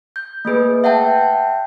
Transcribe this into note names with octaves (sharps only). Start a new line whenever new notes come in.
G6
A3 A#3 G#4 B4
E5 F#5 G5 A5 G6